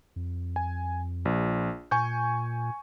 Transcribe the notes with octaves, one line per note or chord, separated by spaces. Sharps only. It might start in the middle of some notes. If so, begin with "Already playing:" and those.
F2
G#5
A#1
A#2 G#5 C#6 G6